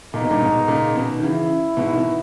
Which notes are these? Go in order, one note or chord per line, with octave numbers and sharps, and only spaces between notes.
A#2 D#4
B2
G2 A#2
G#2 B2
A#2 C#3
B2 D#3
D#3
C#3 E3 E4
G#2 B2
E3
B2 D#3